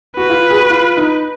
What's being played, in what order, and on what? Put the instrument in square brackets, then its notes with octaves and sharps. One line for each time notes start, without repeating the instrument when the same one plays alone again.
[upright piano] F#4 [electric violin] B4
[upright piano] F4
G#4
F#4
F4
D#4